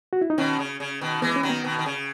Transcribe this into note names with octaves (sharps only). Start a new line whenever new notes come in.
F#4
E4
D#4
B2 D#3 C#4
C#3
C#3
B2 D#3
E3 G#3 B3
C#4
D#3 F#3
B3
B2 D#3
D#3
C#3